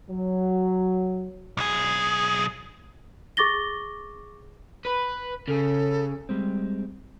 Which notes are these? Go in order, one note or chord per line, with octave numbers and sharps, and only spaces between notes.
F#3
B1 G#4
G#4 C#6 D6 A6 A#6 G7
B4
C#3 A4
G3 G#3 C4